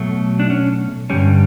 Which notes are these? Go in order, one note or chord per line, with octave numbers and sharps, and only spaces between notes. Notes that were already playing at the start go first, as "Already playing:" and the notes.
Already playing: B2 F#3 A3
D4
C#4
G2 D3 G3 C#4